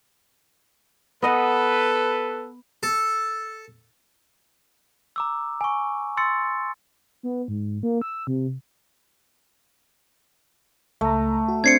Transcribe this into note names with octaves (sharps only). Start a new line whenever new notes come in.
B3 A4 B4 D#5 F#5
A4
A#5 D6 E6
G#5 C#6
C6 E6 A6 C#7
B3
G#2
A#3
E6
C3
C#2 A3 A#5
F#4
C4 D4 C5 G#6 C7 C#7